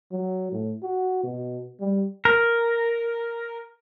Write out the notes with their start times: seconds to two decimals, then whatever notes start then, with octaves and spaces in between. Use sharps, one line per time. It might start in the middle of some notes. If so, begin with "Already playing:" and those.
0.12 F#3
0.52 A2
0.83 F#4
1.23 B2
1.81 G3
2.25 A#4